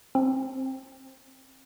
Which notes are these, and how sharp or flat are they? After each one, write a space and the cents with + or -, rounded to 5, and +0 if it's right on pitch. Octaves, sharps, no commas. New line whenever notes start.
C4 +20